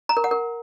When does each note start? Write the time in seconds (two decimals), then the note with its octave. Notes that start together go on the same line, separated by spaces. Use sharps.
0.09 A#5
0.17 A#4
0.24 F#5
0.31 A#4